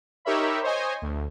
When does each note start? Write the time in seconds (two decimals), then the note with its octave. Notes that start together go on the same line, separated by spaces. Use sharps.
0.25 D#4 G4 A#4 C#5 E5 B5
0.63 C5 C#5 D#5 G#5
1.02 D2